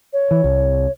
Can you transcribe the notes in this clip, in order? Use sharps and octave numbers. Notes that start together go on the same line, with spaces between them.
C#5
E3
C2